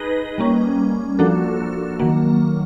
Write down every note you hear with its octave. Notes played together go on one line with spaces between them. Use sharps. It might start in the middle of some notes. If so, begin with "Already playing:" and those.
Already playing: D#4 G#4 B4 D#5
G3 A#3 C#4
F3 A#3 D4 F#4 A4
D#3 F#3 A#3